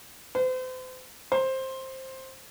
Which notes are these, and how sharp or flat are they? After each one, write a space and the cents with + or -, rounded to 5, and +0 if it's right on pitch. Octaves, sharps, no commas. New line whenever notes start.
C5 -40
C5 +10